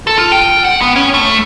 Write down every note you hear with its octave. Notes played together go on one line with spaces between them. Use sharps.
A4
F4
G5
F#5
B3
C#4
A3